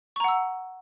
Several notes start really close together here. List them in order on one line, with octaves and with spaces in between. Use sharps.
C#6 A#5 F#5 E6